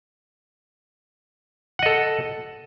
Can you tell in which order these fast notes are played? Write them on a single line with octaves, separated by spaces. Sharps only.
F#5 D#5 A4